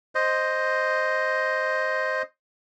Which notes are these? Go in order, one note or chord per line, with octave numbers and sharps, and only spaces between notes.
C5 D#5